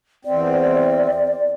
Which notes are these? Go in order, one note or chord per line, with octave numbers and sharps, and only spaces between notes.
E2 C4 D5